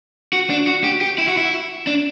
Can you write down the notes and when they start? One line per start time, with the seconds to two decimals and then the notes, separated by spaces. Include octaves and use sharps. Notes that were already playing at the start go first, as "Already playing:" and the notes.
0.33 F#4
0.50 D4
0.67 F#4
0.84 G4
1.01 G4
1.18 E4
1.28 F#4
1.37 E4
1.87 D4